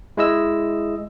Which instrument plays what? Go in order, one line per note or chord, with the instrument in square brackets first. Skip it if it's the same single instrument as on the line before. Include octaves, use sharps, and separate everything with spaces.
[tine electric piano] G#3 E4 D#5 E6